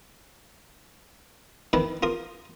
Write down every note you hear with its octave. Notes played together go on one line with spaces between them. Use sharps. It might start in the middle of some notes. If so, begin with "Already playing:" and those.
D#3 E4 B4 A5 B5
F4 A#4 D#6